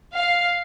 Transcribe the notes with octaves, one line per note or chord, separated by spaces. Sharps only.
F5